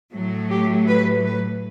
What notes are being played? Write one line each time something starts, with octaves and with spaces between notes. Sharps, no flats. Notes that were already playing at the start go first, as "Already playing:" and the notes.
A2 F#3 A3
G4
B4
B4